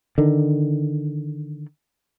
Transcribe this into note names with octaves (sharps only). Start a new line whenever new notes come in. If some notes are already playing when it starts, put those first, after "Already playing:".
D3 D#3